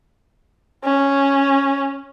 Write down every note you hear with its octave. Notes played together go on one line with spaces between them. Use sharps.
C#4